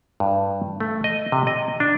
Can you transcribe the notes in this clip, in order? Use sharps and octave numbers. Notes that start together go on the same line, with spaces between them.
G2
A3
D#5
C3
D#5
D4